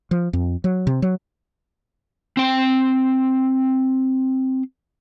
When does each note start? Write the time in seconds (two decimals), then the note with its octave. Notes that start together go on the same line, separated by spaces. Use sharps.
0.11 F3
0.33 F2
0.64 F#3
0.87 C3
1.02 F#3
2.37 C4 G5